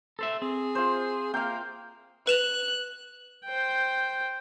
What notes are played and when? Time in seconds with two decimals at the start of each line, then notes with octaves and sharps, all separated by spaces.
0.19 A4 C5 E5
0.42 C4 G#4
0.75 F4 C5
1.34 A#3 F5 G5
2.27 B4 F#6 E7 F7
3.45 C5 G5